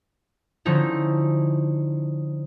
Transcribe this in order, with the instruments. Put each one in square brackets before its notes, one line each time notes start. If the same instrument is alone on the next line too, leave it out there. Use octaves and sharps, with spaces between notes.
[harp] D3 F3 C#4 D#4 E4